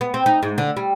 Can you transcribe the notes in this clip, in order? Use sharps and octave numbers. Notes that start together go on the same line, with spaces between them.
B3
C4
D#4
G#2
D3
G3